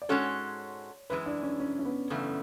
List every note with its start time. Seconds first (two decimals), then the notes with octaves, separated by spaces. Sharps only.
0.02 D5
0.09 G#2 G#3 C#4 F#4 A4 C#5
1.10 F#2 E3 G#3 B4
1.26 D4
1.43 C#4
1.60 C#4
1.79 C#4
1.85 B3
2.10 F#2 C#3 E3 A3